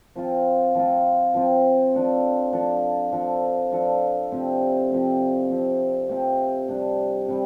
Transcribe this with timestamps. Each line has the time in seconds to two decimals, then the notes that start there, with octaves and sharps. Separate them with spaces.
0.16 F3 C4 F4
0.75 F3 C4 F4
1.34 F3 C4 F4
1.94 F3 D4 A4
2.53 F3 D4 A4
3.12 F3 D4 A4
3.72 F3 D4 A4
4.32 C3 F3 C4 G4
4.91 C3 F3 C4 G4
5.50 C3 F3 C4 G4
6.09 C3 F3 C4 G4
6.68 C3 G3 D4
7.28 C3 G3